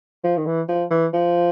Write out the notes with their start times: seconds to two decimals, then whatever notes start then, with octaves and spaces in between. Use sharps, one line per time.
0.24 F3
0.37 D#3
0.46 E3
0.68 F3
0.91 E3
1.14 F3